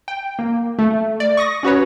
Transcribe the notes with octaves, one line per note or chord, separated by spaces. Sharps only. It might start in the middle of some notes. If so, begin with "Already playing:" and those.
G5
A#3
A3
D5
C#6 D#6 A#6
C#4 F#4 B4 C#5